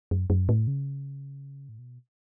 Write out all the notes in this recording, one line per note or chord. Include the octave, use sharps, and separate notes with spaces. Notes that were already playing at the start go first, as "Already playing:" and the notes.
F#2
F#2
A2
C#3
A2
B2